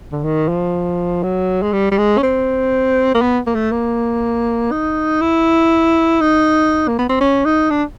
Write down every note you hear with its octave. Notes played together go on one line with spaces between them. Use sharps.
D3
D#3
F3
F#3
G#3
G3
G3
G#3
C#4
C4
A#3
B3
A#3
A3
A#3
D#4
E4
D#4
A#3
B3
C4
C#4
D#4
D4